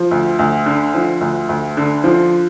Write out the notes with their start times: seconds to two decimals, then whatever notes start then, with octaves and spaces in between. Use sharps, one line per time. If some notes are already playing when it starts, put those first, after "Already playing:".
Already playing: F3
0.11 D2
0.39 D2
0.66 D3
0.94 F3
1.21 D2
1.49 D2
1.77 D3
2.04 F3